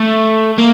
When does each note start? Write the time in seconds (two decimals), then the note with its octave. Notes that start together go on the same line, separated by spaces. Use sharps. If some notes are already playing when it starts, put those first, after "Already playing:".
Already playing: A3
0.58 A#3